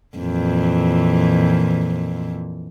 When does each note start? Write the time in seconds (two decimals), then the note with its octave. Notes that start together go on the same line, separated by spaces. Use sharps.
0.18 F2 A#2 E3